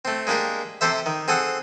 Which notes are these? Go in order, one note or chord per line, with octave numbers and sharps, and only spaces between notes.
A3 C4
G#3 A#3 D4 G4 A#4
C3 G4 A4 C5 E5
D#3
C4 G#4 A4 F#5